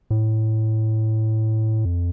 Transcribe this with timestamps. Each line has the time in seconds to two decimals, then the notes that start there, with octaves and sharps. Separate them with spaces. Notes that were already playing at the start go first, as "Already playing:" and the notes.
0.10 A2
1.85 F2